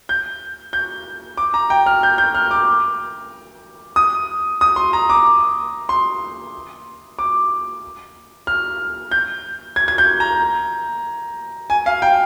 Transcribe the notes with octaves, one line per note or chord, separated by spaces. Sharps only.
G6
G6
D6
A#5
G5
F6
G6
G6
F6
D6
D#6
D#6
C6
A#5
D6
C6
D6
F6
G6
G#6
G#6
G6
A#5
G#5
F5
G5